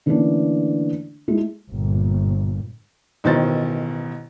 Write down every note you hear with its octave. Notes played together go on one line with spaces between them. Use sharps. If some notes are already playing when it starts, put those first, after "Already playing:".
D3 E3 A3 A#3 C#4 D4
G#3 A3 E4
G1 A#2
A1 B2 D#3 C5 A6